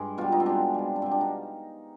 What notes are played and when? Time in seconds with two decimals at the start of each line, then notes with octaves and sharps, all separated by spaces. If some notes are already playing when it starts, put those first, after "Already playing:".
Already playing: G2 G#3
0.18 B2 G3 F4
0.32 D#4
0.40 C4
0.46 B2 G#3 D4
0.74 C3 G3
0.96 D4
1.02 B2 G3 C4
1.11 D4
1.21 D#4